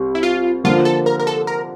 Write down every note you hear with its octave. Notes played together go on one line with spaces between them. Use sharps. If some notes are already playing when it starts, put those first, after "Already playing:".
Already playing: C2 G3
E4
F4
D3 F3 A#3 F4
A4
A#4
A#4
A4
A#4